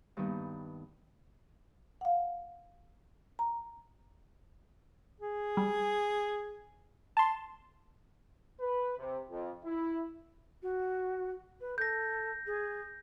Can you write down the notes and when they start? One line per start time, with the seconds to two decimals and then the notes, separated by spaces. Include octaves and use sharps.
0.17 G2 D#3 A#3 B3
2.01 F5 F#5
3.39 A#5
5.20 G#4
5.57 G3
7.17 A5 C6
8.60 B4
8.98 C3
9.29 F2
9.63 E4
10.62 F#4
11.60 B4
11.78 A4 G6 A#6
12.46 G#4